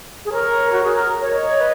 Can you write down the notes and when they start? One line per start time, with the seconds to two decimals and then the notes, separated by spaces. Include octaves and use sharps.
0.25 G#4
0.33 A#4 C#5
0.72 F#4
0.83 G#4
0.95 A#4
1.21 C#5
1.32 C#5 D#5
1.58 B4